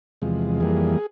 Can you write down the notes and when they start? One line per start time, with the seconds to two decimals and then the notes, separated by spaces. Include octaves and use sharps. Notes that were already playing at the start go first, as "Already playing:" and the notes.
0.22 E2 C3 F3 G#3
0.60 F2 E3 G3 A#3 G#4